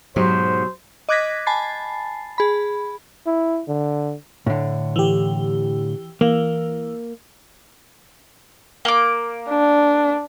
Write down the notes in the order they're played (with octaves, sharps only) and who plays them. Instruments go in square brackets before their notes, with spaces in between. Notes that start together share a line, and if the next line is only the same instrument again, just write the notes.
[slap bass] G#2 [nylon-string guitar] B2 F#3 G4 [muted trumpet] C5
[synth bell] D#5 D6 F#6 G#6 A#6 B6
G#5 A5 B5 A6 C7
G#4 B5
[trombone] E4
D3
[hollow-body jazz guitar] A2 D3
[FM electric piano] E3 G4
[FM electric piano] E3 [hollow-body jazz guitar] A#3
[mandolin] A#3 D6
[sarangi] D4